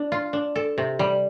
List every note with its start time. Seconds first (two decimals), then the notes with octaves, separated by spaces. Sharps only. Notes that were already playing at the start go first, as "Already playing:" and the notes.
Already playing: D4
0.12 F4
0.33 D4
0.56 A4
0.78 C3
0.99 G3